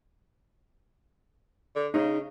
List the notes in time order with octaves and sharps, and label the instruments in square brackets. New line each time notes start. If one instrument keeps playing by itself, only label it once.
[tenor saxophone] D3
[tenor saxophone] C#3 [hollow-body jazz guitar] D#4